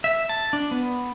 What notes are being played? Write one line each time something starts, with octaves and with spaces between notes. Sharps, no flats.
E5
A5
D4
B3